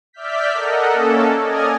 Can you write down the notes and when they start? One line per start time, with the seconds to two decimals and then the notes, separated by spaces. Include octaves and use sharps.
0.13 D5 E5 F6 G6 B6
0.54 A4 A#4 D#5 F#5
0.92 A#3 C#4 A4
1.42 D5 D#5 G#5 D#6 F6 G#6